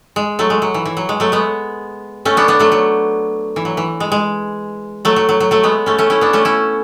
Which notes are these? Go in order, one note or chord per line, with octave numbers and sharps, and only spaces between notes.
G#3
F#3 A3
G#3
F#3
E3
E3
F#3
G#3
F#3 A3
G#3 B3
A3 C#4
B3 D4
B3 D4
F#3 A3
F#3
E3
F#3
E3
G#3
G#3
F#3 A3
F#3
F#3
F#3
F#3 A3
G#3 B3
A3 C#4
A3 C#4
C#4 E4
B3 D4
A3 C#4
C#4 E4